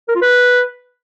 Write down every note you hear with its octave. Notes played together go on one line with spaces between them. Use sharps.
A#4
F4
B4